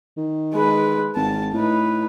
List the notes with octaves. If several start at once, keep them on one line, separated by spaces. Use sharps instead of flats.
D#3
G#3 B4
G#1 A5
A2 D#4 B4